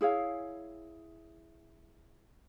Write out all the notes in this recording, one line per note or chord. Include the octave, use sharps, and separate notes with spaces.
E4 G#4 C#5 F5